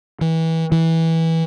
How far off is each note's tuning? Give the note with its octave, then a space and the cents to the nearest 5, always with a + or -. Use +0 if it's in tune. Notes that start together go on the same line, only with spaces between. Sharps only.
E3 -25
E3 -15